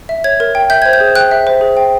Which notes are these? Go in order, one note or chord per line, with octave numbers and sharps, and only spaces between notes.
E5
C#5 G#6
A#4
G5
E5 G6
C5 G#6
G6
G#4
G5 F#6
E5
C5
G#4
G5